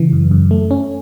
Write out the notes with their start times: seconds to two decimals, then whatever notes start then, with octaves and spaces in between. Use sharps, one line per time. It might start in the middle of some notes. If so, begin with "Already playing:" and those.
Already playing: C#3 E3
0.13 F#2
0.31 F#2
0.51 A3
0.71 C#4